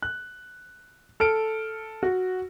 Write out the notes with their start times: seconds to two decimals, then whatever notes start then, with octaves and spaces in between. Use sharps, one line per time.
0.03 F#6
1.20 A4 F6 D7
2.03 F#4